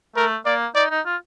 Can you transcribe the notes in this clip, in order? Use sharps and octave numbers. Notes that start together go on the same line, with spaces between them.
A3 A#4
A#3 D5
D#4 D5
D#4
F4